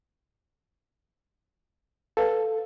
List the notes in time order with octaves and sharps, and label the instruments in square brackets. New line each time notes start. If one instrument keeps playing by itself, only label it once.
[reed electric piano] A4 [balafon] B4 F5